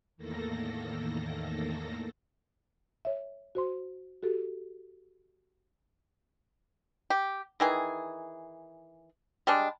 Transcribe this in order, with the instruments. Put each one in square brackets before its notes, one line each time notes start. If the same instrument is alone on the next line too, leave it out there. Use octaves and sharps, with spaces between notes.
[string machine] E2 A2 D#3 A#3 A4 A#6
[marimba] C#5 E5
F#4 C5 C6
F#4 G4 A4
[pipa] G4
D#3 E3 G#4
G3 G#3 D4